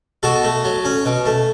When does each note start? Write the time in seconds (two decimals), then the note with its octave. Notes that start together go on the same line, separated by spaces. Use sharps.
0.23 B2 F#4 A4
0.43 A3
0.65 F#3
0.85 C#4
1.05 B2
1.25 A3